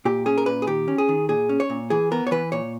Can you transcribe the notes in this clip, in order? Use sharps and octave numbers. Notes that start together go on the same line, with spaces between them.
A#2 G4
C#4 G#4
A#4
A#2 B4
G#4
D#3 G4
C#4
G#4
D#3
A#2 G#4
C#4
C#5
A#2
E3 G#4
B3 A#4
C#5
E3 B4
A#2 C#5